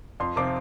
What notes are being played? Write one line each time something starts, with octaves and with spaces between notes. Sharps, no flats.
F2 C6
C3 F3 C4 D6